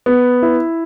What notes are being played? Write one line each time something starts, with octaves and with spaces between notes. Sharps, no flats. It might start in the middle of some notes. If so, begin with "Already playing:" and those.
B3
E4